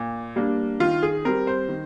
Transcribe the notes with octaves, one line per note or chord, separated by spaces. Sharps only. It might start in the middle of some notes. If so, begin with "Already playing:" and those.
Already playing: A#2
G3 A#3 D4
D#3 F4
G#4
G3 C4 A#4
C5
D#3